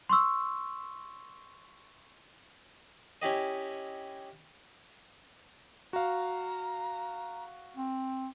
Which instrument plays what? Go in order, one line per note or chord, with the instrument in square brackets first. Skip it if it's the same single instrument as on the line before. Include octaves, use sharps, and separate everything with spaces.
[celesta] C6 C#6 E6
[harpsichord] C#4 E4 G4 D#5
[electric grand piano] F#4 F5 [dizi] A#5
[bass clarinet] C4